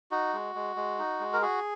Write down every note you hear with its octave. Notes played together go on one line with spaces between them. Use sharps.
D#4 F#4
G#3
G#3
G#3
D#4
G#3
A#4
F#4 G#4